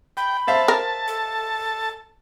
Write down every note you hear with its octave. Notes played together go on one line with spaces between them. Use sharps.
G5 B5
C5 E5 F5 A5
A#4
A4